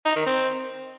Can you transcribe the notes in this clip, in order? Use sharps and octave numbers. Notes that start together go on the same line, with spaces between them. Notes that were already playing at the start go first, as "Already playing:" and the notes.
D#4
D#3
C4